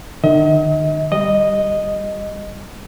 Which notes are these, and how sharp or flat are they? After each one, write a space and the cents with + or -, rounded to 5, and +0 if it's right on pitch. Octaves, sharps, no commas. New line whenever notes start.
D#3 -45 D#5 +40
G3 +0 D#5 -5